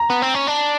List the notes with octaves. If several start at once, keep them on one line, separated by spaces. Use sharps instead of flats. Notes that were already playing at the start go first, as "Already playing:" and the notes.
Already playing: A#5
B3
C4
C#4
D4